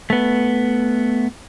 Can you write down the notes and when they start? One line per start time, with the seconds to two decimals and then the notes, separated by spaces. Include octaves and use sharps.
0.10 A3 B3